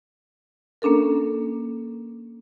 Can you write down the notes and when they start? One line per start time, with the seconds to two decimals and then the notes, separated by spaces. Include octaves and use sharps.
0.82 A#3 C#4 D4 A4 A#4